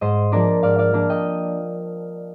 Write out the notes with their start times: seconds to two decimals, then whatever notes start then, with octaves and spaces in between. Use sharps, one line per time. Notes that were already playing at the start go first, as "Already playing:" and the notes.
0.01 G#2 C5 D#5
0.32 F3 A#3 D4 A#4 D5
0.63 G#2 D5 F5
0.78 D5 F5
0.93 F3 A#3 D4
1.09 D#5 G5